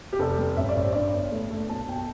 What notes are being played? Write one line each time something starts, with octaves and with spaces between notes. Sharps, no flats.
G4
F1 A4
G3
A1 E5
D5
A1 C5
G2 D5
G1
A3
A3
B1 A5
B1 G5
A5